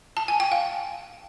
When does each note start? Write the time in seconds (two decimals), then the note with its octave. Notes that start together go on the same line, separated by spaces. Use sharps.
0.17 A5
0.28 G#5
0.40 G5
0.52 F5